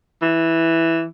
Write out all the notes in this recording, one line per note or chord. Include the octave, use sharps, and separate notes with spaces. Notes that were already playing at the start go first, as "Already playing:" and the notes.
E3